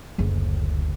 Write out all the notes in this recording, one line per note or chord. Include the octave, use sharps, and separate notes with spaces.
F#1 D2